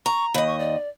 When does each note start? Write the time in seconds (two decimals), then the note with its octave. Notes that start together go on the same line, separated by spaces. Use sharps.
0.06 A#5 C#6
0.34 D#2 D#5 B5
0.47 C#6
0.59 D5